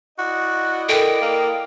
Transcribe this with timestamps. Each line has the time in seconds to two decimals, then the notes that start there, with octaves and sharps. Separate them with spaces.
0.19 E4 F#4 D5 D#5
0.89 A4 A#4 G5
1.21 A#3